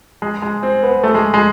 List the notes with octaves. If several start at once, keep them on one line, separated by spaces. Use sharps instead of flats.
G#3
G#3
C4
B3
A3
G#3
G#3